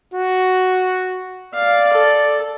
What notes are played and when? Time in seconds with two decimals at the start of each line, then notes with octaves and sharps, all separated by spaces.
0.14 F#4
1.54 D5 F5
1.93 A4